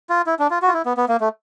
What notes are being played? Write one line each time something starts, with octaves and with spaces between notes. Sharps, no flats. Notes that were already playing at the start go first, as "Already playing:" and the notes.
F4
E4
D4
F4
F#4
F4
E4
B3
B3
A#3
A3